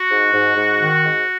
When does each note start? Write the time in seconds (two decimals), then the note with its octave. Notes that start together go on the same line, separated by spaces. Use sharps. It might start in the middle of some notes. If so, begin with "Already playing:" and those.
Already playing: F#4
0.09 G#2
0.33 G#2
0.56 G#2
0.79 D#3
1.03 G#2